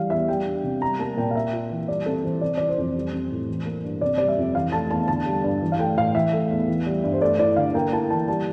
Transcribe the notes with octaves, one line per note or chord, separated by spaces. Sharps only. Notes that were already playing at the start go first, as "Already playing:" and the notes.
Already playing: E3 G3 F5
E2 E5
G3 G5
D4
C3
G3 A#5
A#3 A5
A#2 G5
F5
A#3 E5
F4
E3
G3 D5
C4 A4
E3 C5
C3 D5
E3 D5
C5
F2
G3
C4
A2
E3
A#3
G2
C3 D5
G3 D5
E5
F2
E3 F5
A3 A5
E2 A5
D3 A5
G3
G2
E3
F5
A3 G5
A2 F5
E3 E5
A3
E2
E3
G3
G2
C5
A3 D5
E4 D5
D3 F5
A#3 G5
E4 A5
E3 A5
G3 A5